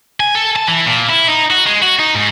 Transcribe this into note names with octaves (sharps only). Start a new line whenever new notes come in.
G#5
A4
A5
E3
A#2
E4
D#4
F#4
G#3
F#4
D#4
G#2